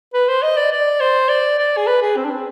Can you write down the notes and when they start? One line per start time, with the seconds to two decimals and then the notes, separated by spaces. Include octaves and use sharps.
0.14 B4
0.28 C5
0.42 D#5
0.57 D5
0.71 D5
1.00 C5
1.29 D5
1.58 D5
1.77 G#4
1.87 B4
2.02 G#4
2.16 C4
2.24 D4
2.30 C4